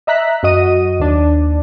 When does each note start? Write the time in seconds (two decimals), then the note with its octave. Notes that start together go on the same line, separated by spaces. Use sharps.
0.07 D#5 E5 A#5 F#6 B6
0.43 F#2 F#4 D#5 D#7
1.00 D#2 D4